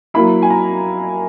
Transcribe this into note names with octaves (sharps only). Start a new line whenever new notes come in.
F#3 A#3 E4 B5
G#5
A#5